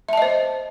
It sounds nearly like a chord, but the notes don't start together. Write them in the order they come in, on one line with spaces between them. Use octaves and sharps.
E5 A5 D#5 C5